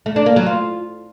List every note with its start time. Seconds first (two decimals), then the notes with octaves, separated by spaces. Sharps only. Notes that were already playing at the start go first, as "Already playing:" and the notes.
0.06 A3
0.16 D4
0.26 A#3
0.36 F#3
0.46 F4